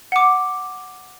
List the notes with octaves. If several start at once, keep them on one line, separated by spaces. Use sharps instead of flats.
F#5 D6